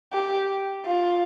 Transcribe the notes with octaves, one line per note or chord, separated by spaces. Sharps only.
G4
F4